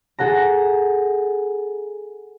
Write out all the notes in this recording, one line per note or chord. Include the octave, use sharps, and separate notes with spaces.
G#4 A4 F#5 A#5